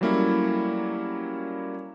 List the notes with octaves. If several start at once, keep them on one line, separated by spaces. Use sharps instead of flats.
F#3 G3 A3 A#3 C#4 E4